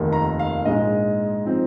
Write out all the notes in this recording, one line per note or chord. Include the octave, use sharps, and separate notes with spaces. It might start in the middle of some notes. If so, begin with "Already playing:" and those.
Already playing: F1 D#2 D#3
A#5
F5
A#1 G#2 G#3 D#5
F3 C4 D#4